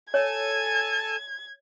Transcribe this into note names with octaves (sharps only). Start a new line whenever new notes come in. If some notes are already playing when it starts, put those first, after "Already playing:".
A4 C#5 G#5 A5 G#6